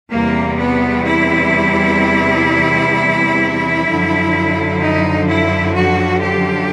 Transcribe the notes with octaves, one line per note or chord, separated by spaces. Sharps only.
E2 C3 E3 G3 A#3
B3
E4
F#2 D3 F3
D#4
E4
F#4
G4